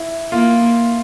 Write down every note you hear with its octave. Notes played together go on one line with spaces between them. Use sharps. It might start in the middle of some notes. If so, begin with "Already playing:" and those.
Already playing: E4
A#3 F4